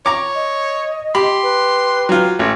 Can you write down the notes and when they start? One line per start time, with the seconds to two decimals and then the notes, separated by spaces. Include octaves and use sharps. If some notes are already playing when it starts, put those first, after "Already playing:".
0.06 C#5 A#5 D6
0.35 D#5
1.15 G4 B5 C6
1.43 B4
2.09 F#3 F4
2.39 A1 C#5